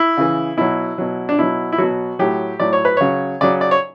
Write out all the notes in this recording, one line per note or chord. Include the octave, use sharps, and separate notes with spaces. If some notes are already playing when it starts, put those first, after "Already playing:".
Already playing: E4
C#3 E3
B2 F#3 E4
B2 F#3
D4
B2 F#3 E4
E4
B2 F#3 F#4
A2 F#3 G4
A2 F#3 D5
C#5
B4
C#3 F#3 C#5
C#3 F#3 D5
D5
C#5